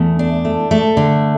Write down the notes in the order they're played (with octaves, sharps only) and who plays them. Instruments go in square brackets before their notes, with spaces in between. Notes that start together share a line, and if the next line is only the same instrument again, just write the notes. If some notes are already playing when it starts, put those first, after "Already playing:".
Already playing: [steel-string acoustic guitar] E2 A3
D4
A3
A3
D3